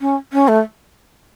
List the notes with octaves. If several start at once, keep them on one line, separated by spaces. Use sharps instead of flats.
C#4
C#4
A3